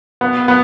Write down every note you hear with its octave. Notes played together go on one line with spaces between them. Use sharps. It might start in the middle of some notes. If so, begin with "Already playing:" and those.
B3
B3